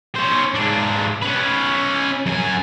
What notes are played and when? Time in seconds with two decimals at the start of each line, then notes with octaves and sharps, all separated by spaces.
0.15 C#4 C5
0.54 G#2 D4
1.22 C#4 B4
2.26 F#2 G#5